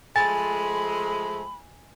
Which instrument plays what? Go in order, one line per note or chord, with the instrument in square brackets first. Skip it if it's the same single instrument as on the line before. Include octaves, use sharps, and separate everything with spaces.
[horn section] F3 G#3 A3 [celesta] G#5 [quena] B5 [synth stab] A6